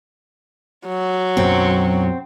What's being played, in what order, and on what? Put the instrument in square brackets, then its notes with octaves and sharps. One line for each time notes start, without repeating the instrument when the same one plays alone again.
[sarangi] F#3
[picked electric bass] B1 F#2 [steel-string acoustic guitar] C4